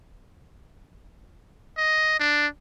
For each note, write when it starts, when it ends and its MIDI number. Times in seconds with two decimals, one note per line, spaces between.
1.78 2.20 75
2.20 2.47 62